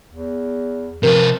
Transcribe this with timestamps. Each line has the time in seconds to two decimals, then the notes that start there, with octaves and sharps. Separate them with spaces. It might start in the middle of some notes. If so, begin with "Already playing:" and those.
0.13 E2
1.03 C3 F3 A#4 B4